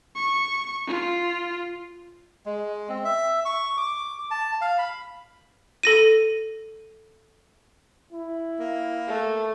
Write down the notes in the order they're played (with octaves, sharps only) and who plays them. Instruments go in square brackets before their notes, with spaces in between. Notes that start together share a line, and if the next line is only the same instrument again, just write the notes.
[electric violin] C#6
F4
[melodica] G#3
C4
E5
C#6
D6
A5
F5
B5
[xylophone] A4 A#6 D#7
[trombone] E4
[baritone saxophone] A#3
[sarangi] A3